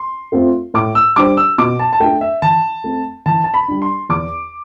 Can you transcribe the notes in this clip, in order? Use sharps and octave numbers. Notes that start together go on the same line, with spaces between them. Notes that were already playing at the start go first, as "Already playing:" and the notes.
Already playing: C6
A3 C4 F4 A4
A2 D6
E6
G3 D4 G4 C5 D6
E6
B2 D6
A5
A5
A3 D4 A4 G5
E5
E3 A5
A3 C4
E3 A5
A5
B5
G3 D4
C6
E2 D6